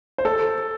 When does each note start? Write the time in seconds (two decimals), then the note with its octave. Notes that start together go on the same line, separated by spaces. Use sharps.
0.18 C5
0.25 A4